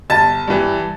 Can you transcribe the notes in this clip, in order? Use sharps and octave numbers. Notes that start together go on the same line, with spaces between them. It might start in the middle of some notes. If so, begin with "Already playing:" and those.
G1 A5 A6
G2 E3